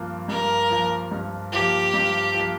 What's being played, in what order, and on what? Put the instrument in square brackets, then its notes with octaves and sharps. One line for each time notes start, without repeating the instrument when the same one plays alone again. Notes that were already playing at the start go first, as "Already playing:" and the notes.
Already playing: [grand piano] G2 F3 A#3
[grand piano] G2 [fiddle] A#4
[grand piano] F3 A#3
G2
[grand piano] F3 A#3 [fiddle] G4
[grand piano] G2
F3
A#3